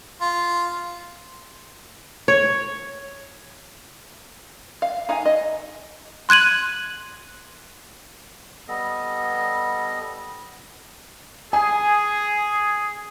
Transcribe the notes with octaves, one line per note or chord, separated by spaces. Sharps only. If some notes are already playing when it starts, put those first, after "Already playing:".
F4
C#5
F5
D#4 F5 G#5
D#5
C6 F#6 G#6 D#7 F#7
G3 B3 A4 D#5
G#4 G#5